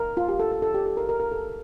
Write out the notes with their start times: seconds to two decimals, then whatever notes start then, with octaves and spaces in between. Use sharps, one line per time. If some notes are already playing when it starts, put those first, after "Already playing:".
Already playing: A#4
0.17 F4
0.28 G4
0.39 A4
0.52 A4
0.62 A4
0.74 G4
0.86 A4
0.97 A#4
1.09 A#4
1.20 A#4
1.31 A4